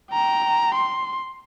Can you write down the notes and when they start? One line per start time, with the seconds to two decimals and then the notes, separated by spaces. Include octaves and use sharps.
0.12 G5 A#5
0.75 C6